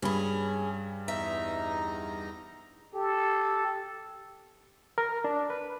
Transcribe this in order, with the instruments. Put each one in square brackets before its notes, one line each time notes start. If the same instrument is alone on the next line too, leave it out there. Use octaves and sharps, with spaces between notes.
[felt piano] G2 B5 [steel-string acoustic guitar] C#4 G#4
[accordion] E2 D#4 A#5 [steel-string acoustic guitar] E5
[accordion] G4 [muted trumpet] A4
[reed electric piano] A#4
D4
B4